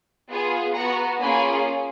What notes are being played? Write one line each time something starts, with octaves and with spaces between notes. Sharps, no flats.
B3 F4 G#4
B3 F#4 F#5 A#5
A#3 C#4 F4 G#4 G#5 B5